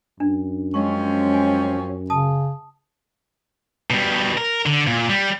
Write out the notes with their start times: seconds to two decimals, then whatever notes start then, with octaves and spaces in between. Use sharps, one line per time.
0.20 F#2 D4
0.74 F3 G#3 C4 C#4 C#6
1.34 G#5
2.10 C#3 A5 D#6
3.90 B2 G3
4.37 A#4
4.66 D3
4.87 A#2
5.09 G3